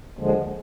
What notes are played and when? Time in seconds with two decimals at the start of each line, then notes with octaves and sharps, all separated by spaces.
0.17 D#2 D3 F3 G#3